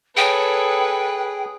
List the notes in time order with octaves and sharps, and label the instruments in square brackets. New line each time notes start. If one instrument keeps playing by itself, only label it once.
[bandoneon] G#4 [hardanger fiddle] A4 C#5 [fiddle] B4 [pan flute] G5